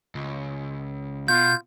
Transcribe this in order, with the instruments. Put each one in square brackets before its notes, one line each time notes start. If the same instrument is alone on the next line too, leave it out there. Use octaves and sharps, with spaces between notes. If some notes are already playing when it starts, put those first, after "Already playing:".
[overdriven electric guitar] C#2
[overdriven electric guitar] B2 [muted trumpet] F4 [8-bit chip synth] G6